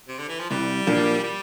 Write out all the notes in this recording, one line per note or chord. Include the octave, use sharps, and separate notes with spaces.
C3
D3
E3
F3
C2 G3
A#2 F3 A#3 D4
G3